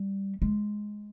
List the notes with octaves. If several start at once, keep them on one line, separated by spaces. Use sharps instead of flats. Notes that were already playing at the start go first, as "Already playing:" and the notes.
Already playing: G3
G#3